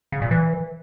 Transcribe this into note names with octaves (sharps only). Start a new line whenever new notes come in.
C#3
A#2
E3